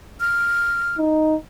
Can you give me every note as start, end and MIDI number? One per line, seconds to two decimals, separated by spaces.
0.20 0.97 89
0.99 1.35 63